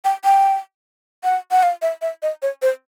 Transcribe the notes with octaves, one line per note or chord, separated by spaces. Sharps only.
G5
G5
F#5
F#5
F5
E5
E5
D#5
C#5
C5